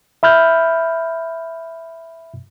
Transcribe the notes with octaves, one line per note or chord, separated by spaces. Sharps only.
E5 B5 F6 G6